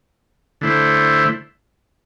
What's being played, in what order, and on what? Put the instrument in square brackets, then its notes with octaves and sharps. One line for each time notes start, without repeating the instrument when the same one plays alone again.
[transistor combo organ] D3 A3 E4 C5